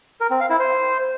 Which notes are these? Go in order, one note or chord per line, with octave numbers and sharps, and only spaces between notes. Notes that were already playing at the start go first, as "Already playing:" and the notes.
A#4
C4
F5
E4
C5